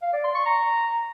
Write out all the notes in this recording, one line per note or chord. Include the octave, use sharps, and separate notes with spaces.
F5
D5
C6
C#6
A#5